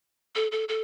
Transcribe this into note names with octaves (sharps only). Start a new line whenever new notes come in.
A4
A4
A4